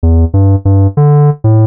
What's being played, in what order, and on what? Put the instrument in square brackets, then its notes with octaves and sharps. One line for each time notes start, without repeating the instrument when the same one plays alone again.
[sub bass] E2
G2
G2
D3
A2